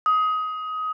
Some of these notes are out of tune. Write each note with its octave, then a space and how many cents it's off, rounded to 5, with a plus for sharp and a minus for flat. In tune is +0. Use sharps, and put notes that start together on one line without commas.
D#6 +20